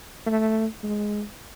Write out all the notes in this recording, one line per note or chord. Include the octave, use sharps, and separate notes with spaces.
A3
G#3